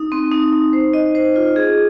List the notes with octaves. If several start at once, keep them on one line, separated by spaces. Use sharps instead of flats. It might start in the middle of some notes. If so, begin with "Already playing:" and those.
Already playing: D#4
C4
D#4
D#4
C5
D#5
C5
F4
G#4